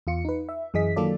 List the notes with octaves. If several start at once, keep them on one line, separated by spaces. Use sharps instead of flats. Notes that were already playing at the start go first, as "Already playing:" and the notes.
E2 F4 C#7
D#4 B4
E5
F#2 E3 G#4 D#5 B6
D#3 F#3 A#3 F4 A4 D5